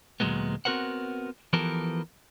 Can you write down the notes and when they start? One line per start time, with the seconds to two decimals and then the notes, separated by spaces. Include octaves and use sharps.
0.20 D2 A#2 D3 F#3 G#3 B3
0.65 B3 C4 F#4 A#4 C5 F#5
1.53 E3 F3 B3 G4 A4 A#4